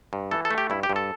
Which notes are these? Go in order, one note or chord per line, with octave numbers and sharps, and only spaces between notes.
G2
E3 A4
A4
A3
G4
G2 E4
G4
G2
A4